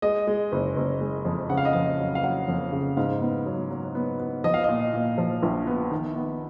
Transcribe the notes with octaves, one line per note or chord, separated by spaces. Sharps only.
G#3 D#5
G#3
F#1
F#1
G#3
F2
C#3 F#5
F5
D#5
F2 F5
F#3
F5
F#3 F#5
F2
C#3
G#2 F5
B3
F#3
F#3
B3
B3
F3 D#5
F5
A#2 D#5
A#2
F3
A#1
B3
D#3
B3